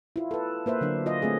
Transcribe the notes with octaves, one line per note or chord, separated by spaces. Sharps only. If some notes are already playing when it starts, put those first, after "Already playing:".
E4 F4
A4 B4
A#3 B4 C5 E5
D3 F#3 D4
F4 D#5
A3 C4 G#4